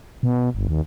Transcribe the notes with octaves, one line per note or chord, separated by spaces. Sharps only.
B2
G1
D#2